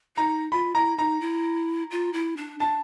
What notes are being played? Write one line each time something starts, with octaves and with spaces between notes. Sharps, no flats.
D#4 A#5
F4 B5
E4 A#5
D#4 A#5
E4
F4
E4
D4
D4 A5